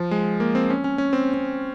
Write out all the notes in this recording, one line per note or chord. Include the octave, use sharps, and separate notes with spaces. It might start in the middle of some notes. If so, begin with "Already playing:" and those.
Already playing: F3
G#3
A#3
C4
C#4
C#4
C#4
C4
C4